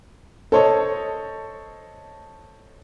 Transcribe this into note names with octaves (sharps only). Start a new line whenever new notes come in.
A4 C5 C#5 D#5 A5